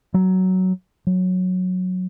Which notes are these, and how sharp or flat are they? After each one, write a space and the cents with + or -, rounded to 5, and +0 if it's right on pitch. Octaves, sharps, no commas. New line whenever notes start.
F#3 +10
F#3 -10